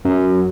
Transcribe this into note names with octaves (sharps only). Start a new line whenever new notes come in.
F#2